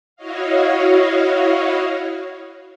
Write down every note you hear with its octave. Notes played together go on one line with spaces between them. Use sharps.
E4 F#4 C#5 D#5 F5